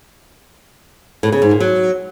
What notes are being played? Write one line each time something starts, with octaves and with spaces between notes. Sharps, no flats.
A2
C#3
G#2
A#2
F#3